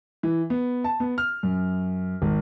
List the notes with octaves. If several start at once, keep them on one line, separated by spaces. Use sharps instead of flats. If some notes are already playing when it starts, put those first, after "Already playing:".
E3
B3
A5
B3
F6
F#2
G#1